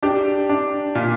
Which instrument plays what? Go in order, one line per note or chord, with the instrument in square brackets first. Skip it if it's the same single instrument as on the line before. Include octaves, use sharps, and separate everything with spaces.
[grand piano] D4 G4
D4
A#2